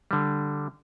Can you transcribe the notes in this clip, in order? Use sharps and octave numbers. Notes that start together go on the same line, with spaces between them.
D3 G3